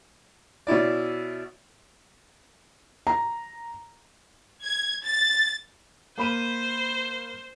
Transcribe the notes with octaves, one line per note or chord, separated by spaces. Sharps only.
B2 C#4 E4 D5
A#5
G#6
A6
A#3 C5 B5 D#7